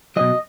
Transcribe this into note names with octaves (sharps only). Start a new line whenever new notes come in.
B2 F#3 D#5